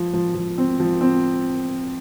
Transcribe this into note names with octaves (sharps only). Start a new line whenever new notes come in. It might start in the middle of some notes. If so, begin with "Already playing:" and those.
Already playing: F3
F3
F3
C4
F3
C4